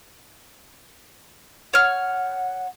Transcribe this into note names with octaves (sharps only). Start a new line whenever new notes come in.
C#5 F#5 F6